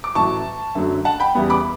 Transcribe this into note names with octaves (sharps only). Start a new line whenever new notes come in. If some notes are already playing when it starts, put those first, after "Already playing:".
D6
A1 A2 F#3 A5 C#6
F#2 D3 F#3 A3
F#5 A5
G5 B5
E2 C#3 E3 G3 B3
B5 D6